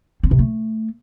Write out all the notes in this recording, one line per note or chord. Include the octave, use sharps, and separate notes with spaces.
C4
C3
A3